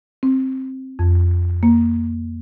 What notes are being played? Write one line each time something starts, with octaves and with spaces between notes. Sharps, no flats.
C4
F2
A#3